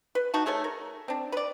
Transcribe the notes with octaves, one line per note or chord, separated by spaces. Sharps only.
B4
D#4 F#4 A5
A3 G#4 A4 C#5
A#4
C4 D4
B4 D5